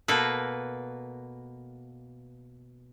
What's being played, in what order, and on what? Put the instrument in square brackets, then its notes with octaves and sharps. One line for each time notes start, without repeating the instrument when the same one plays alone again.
[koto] B2 A#3 A4 B4